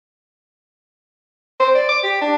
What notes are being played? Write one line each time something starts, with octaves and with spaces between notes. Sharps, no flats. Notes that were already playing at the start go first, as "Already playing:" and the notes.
C5
D5
D6
G4
D4